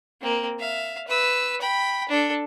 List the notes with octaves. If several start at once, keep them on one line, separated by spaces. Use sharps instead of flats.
A#3 C4
E5 F5
B4 E6
G5 B5
D4 A4